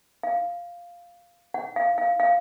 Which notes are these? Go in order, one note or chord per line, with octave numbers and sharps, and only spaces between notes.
F5
F#5
F5
F5
F5